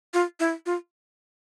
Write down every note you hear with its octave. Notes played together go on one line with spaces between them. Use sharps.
F4
E4
F4